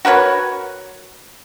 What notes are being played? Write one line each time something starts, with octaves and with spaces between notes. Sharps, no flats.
F#4 A#4 B4 C#5